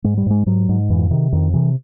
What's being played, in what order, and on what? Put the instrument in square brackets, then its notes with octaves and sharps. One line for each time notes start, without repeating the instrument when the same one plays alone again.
[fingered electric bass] G#2 G#3
G3
G#2 G#3
G#2 F#3
G#2
F2 E3
C3 D#3
F2 D#3
C3 E3